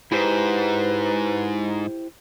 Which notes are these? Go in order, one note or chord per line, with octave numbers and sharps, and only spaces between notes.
G#2 E4 G4 B4 C5